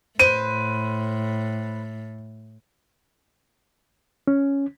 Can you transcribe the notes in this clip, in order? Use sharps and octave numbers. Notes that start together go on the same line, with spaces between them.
A2 B4 C5 D#7
C#4